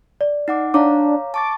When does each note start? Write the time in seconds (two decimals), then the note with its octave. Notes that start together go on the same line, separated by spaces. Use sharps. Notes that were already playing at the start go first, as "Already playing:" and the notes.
0.21 D5
0.48 D#4 F#5 D6
0.74 D4 C#5 F5 A#5 D6
1.34 A5 C#6 D6 A6